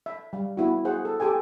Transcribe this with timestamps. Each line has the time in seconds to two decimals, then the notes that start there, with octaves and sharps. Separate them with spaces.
0.06 E5
0.33 G3 F5
0.57 B3 E4 F#4
0.85 F#4 G#4 C5 F#5
1.05 A4
1.20 G4 A4 G5 G#5